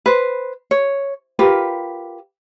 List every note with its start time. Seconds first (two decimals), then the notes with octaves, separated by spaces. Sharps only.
0.06 B4 C5
0.71 C#5
1.39 F4 G4 A#4 B4